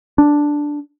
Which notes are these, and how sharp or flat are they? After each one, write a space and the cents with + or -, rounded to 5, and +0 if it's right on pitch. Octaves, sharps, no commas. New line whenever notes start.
D4 +0